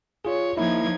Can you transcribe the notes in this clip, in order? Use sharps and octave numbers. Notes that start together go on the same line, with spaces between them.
F4 G#4 C#5
F3 A#3 D#4 E4 G#6